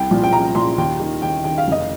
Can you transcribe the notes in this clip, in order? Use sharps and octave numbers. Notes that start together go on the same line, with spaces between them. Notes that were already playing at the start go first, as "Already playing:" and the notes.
Already playing: C2 G5
A#2 F3
G5
C2 A#5
A#2 F3 C6
D#2 G5
D#3
D#2 G5
D#3 G5
F5
F1 D#5